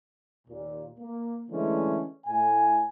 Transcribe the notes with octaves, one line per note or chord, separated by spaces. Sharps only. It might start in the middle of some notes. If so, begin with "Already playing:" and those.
D#2 A#2
A#3
D3 E3 G#3 A3 C#4
A2 G#5